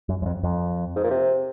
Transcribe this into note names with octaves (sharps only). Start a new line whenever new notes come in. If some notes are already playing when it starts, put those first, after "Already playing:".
F#2
F#2
F2
F2
G#2
A#2
C3